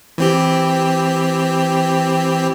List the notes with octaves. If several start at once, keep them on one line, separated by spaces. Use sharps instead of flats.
E3 C4 G4